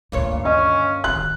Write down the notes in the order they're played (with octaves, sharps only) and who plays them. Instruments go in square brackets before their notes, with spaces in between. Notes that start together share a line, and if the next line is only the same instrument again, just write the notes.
[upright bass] D2 D#3 [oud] G2 A#2 C#5
[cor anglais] C#4 [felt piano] D#5
[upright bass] D1 D#3 [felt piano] F#6